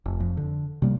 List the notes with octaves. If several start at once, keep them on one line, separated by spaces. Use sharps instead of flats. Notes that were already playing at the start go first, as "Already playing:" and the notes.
F1
F2
D3
C3 G3 A#3